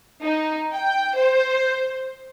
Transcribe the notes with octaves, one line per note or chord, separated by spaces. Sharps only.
D#4
G5
C5